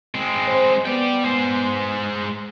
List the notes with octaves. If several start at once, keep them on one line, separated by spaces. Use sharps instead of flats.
G#3 C4
C5
B3 D5 G5
G#3 C5